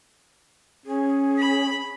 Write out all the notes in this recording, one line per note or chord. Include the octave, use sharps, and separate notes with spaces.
C#4 G#4
B5